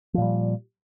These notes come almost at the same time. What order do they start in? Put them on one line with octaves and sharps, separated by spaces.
F3 A#2 G3